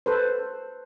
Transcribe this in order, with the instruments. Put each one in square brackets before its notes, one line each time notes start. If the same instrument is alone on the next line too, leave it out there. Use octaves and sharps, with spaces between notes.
[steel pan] A4 B4 C5